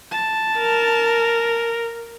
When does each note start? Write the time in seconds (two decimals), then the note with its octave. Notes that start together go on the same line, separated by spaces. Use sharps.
0.11 A5
0.59 A#4